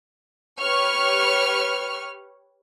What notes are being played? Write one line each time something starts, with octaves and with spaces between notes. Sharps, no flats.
G4 B4 C#5 C#6 F6